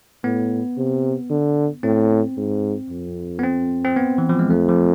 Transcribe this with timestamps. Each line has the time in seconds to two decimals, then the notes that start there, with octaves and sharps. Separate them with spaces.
0.24 A2 B3
0.77 C3
1.30 D3
1.83 A2 C4
2.37 G#2
2.90 F2
3.39 B3
3.43 C4
3.85 C4
3.97 B3
4.18 E3
4.29 F3
4.39 G#3
4.50 F2 A3
4.69 F3